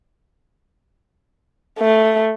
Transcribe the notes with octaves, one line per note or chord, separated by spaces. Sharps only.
A3